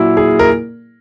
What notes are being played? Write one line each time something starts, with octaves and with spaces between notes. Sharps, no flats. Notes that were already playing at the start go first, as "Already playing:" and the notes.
Already playing: A#2 F#3 E4
G#4
A#4